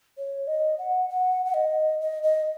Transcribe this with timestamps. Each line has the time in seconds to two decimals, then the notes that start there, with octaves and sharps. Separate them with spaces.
0.18 C#5
0.47 D#5
0.78 F#5
1.10 F#5
1.45 F#5
1.54 D#5
2.01 D#5
2.23 D#5